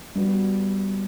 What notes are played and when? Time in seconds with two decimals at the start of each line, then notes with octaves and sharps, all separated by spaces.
0.15 G3 B3 F#4